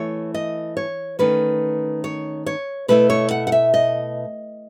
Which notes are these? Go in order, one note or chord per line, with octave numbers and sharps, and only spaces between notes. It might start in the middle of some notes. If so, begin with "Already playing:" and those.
Already playing: E3 A3 E4 C#5
D#5
C#5
D#3 A3 C#4 B4
C#5
C#5
B2 A3 E4 B4
C#5
F#5
F#5
E5
D#5